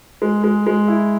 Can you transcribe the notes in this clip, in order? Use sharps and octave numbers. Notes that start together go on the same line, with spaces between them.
G#3
G#3
G#3
E4